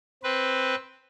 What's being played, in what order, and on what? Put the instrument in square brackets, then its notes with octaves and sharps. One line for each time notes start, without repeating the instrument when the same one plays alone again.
[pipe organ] C4 B4